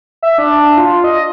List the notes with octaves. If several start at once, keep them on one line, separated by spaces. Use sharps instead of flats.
E5
D4
F4
D#5